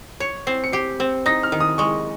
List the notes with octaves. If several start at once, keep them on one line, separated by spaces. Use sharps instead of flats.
C#5 C#7
C4 C7
C#7
G4 C7
C4
D#4 A#6
F6
D#3
D#6
G#3 C#6